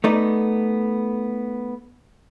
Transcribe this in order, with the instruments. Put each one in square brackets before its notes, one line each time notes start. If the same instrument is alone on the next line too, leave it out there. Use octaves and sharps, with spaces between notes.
[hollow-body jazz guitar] A3 B3 D#4 D5